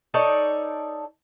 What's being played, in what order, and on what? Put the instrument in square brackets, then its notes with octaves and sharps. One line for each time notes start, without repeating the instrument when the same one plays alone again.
[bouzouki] D#4 A4 C#5 D5